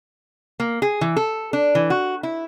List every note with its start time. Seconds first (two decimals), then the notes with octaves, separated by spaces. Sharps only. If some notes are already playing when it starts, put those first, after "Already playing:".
0.60 A#3
0.82 G#4
1.01 E3
1.16 A4
1.53 D4
1.75 E3
1.90 F#4
2.23 E4